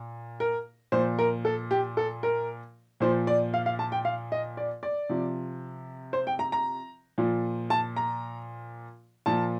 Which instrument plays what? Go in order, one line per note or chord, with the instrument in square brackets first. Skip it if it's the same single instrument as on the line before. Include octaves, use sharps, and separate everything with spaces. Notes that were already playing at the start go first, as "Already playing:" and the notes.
Already playing: [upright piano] A#2
A#4
A#2 F3 C5
A#4
A4
G4
A4
A#4
A#2 F3 C5
D5
F5
F5
A5
G5
F5
D#5
D5
D5
C3 F3
C5
G5
A#5
A#5
A#2 F3
A5
A#5
A#2 F3 A5